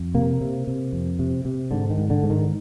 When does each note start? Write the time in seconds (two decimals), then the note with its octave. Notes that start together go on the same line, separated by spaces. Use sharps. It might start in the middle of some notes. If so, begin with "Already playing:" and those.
Already playing: F2
0.14 C3 A#3
0.41 C3
0.67 C3
0.93 F2
1.19 C3
1.45 C3
1.71 G#2 D3
1.90 D#3
1.98 G#2
2.10 D3
2.23 G#2
2.30 D#3